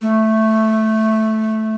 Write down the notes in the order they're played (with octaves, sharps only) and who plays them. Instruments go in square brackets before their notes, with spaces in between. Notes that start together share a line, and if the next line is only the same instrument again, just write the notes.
[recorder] A3